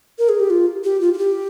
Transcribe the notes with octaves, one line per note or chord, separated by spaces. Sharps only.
A#4
G#4
G4
F4
G4
F4
F4
G4